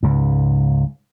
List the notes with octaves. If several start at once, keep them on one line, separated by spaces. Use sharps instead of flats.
C#2 G#2